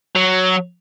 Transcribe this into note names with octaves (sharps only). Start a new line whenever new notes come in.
F#3